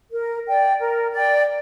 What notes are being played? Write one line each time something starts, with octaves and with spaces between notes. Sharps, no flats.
A#4
D5 G5
A#4
D5 G5